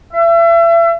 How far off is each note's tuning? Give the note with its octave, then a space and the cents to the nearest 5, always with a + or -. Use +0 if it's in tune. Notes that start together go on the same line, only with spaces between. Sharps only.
E5 +35